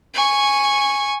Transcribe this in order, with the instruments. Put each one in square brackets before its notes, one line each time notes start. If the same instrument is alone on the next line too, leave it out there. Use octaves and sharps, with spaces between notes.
[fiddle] G#5 C#6